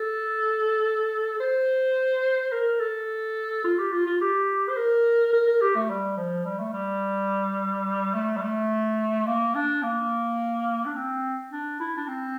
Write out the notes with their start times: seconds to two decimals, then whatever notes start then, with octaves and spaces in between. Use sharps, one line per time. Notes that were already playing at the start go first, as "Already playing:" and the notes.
Already playing: A4
1.40 C5
2.52 A#4
2.80 A4
3.64 F4
3.78 G4
3.92 F4
4.06 F4
4.21 G4
4.69 C5
4.77 A#4
5.33 A#4
5.47 A#4
5.61 G4
5.75 A3
5.90 G3
6.17 F3
6.45 G3
6.60 A3
6.73 G3
8.14 A3
8.37 G3
8.42 A3
9.27 A#3
9.55 D4
9.83 A#3
10.86 D4
10.96 C4
11.52 D4
11.80 E4
11.97 D4
12.08 C4